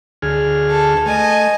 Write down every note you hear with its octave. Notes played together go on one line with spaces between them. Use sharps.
D2 G#4 F6
A4
A3 D#5 G#5